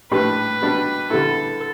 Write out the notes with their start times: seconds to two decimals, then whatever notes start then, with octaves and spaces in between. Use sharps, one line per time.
0.12 A2 G3 D4 G4 B4
0.62 B2 G3 D4 G4
1.10 D3 G3 B3 E4 A4